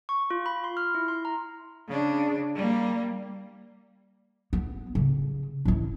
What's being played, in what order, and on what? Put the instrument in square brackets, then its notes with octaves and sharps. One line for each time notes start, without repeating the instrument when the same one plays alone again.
[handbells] C#6
F4
B5
C6
F6
E4
C6
A#5
[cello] C#3 D4
G3 A#3
[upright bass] B3
C#3
E3 C#4